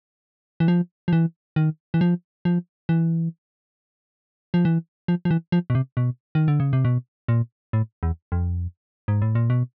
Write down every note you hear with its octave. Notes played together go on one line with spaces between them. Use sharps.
E3
F3
F3
E3
D#3
E3
F3
F3
E3
F3
E3
F3
F3
E3
F3
B2
C3
B2
D#3
D3
C#3
C3
B2
A#2
A2
E2
F2
G#2
A2
A#2
B2